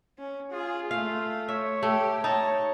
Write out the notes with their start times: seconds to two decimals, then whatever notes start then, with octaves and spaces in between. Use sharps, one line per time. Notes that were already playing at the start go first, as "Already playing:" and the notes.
0.19 C#4
0.52 F4 G#4
0.91 A3 F5
1.48 C#5 E5
1.83 A3 G4
2.24 D#4 C#5 A5